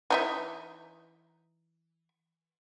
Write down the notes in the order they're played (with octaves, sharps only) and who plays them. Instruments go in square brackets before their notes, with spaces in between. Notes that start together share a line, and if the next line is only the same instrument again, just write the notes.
[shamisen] E3 D#4 E5